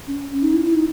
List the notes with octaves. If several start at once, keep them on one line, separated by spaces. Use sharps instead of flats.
C#4
D#4
E4
E4
D#4